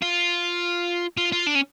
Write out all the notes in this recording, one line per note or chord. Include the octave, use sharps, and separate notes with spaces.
F4
F4
F4
D4
C#4